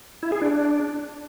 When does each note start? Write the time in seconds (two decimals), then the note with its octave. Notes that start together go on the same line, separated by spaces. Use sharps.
0.23 E4
0.32 G#4
0.42 D4